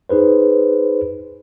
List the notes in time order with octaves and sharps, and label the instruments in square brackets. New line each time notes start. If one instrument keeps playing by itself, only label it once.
[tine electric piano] D#4 G#4 B4 C5